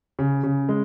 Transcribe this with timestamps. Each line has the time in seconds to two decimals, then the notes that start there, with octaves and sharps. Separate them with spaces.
0.19 C#3
0.44 C#3
0.69 G#3